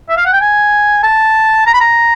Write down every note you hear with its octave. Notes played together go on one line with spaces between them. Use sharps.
E5
F5
F#5
G5
G#5
A5
A#5
B5
A#5